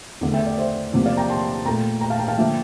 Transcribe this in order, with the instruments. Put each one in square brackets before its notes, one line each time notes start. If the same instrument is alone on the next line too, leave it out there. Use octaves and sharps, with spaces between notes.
[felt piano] E2 D3 A3
E5 G5
D5
C5 E5
E2 C3 F3 A#3
D5 F5
G5 A#5
A5 C6
A#2 A3 G5 A#5
G5 A#5
F5 A5
G5 A#5
F5 A5
D3 F3 A#3 E5 G5